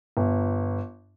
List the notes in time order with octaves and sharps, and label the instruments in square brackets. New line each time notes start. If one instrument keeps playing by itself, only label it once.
[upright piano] G1